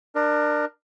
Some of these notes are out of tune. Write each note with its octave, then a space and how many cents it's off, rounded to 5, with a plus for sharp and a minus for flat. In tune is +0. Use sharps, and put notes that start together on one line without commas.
D4 +25 A#4 +0